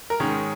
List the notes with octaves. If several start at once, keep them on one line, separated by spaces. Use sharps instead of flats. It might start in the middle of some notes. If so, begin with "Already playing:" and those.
A#4
G#2 D#3 G#3 C#4 C#5